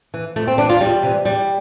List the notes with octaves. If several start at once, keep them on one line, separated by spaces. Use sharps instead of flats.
E3
F2 A3
C4
E3 D4
F4
E2 G3
C3 E3
E2 G3